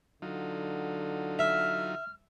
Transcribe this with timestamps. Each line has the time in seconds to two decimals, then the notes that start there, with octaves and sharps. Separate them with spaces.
0.22 D3 F#3 D#4 F4
1.39 E5 F6